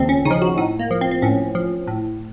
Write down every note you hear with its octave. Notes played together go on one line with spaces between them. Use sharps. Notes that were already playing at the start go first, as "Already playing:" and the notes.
Already playing: D#2 C#3 F3 C4 A4
C#4
C#3 D#4
F3
F#4
A2 D#4
A#3
F3
C4
C4
A2 C#4
F3
A2